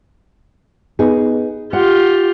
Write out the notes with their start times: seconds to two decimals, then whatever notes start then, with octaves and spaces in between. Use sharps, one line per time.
0.99 B3 D#4 G#4
1.73 F4 G4 F#5